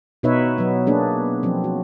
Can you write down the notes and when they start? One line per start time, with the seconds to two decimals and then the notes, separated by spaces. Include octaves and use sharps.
0.23 B2 B3 D#4 B4 C#5 E5
0.58 F#3 B3
0.87 A#3 D4 G#4
1.43 F3 F#3 C4
1.64 F#4